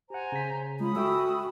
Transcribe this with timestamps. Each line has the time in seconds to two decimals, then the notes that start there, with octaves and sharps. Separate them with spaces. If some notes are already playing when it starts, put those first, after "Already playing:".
0.10 G4 C5 F#5 G#5 A#5
0.32 C#3 B6
0.80 G#3 C#4 F4 B5 D#6
0.96 F#4 A4 E5 G5 E6